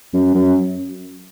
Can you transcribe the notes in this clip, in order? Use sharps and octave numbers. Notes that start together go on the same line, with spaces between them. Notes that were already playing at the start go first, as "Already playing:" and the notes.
F#2
F#2